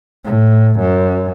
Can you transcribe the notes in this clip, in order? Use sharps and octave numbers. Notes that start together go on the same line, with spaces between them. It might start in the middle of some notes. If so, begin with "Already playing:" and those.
A2
F#2